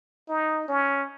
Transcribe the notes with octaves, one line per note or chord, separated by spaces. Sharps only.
D#4
C#4